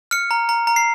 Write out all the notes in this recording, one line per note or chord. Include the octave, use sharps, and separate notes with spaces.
F6 C#7
A#5
A#5
A#5
C7